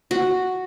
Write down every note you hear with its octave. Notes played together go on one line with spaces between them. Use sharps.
F#4